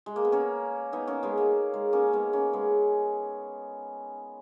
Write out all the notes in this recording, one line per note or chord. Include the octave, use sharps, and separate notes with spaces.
G#3
A#3
B3
A#3 C#4
B3 D#4
A#3 C#4
G#3 B3
A#3
G#3
A#3 C#4
G#3 B3
A#3 C#4
G#3 B3